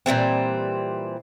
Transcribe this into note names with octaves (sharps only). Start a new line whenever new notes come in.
A#2 E3 G3 C4